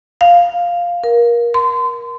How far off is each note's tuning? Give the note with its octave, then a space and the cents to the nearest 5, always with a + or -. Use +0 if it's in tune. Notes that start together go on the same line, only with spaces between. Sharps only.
F5 +0
A#4 +25
C6 -35